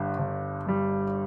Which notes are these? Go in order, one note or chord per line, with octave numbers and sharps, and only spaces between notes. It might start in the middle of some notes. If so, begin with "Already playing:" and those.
Already playing: G1 G2 G3
G1
G2 G3